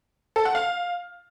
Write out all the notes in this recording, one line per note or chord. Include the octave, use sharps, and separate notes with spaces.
A4
F#5
F5